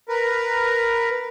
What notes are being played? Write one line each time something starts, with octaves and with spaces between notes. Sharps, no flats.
A#4 B4